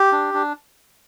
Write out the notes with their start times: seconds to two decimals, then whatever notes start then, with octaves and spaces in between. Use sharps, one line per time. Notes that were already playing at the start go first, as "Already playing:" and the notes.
Already playing: G4
0.12 D4
0.34 D4